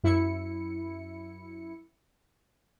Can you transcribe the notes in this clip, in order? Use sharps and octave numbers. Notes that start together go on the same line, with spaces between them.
F#2 E4 C#7